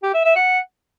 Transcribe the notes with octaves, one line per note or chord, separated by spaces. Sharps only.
G4
E5
E5
F#5